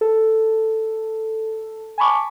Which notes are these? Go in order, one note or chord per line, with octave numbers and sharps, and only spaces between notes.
A4
G#5 A5 B5 C#6 D6